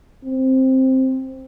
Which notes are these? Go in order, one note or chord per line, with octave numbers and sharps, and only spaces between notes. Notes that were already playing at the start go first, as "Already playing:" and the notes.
C4